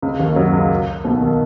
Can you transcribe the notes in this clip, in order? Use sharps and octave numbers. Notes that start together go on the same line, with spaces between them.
C#2 C#3
D#2 D#3
F#2 F#3
C#2 C#3
B1 B2
D#3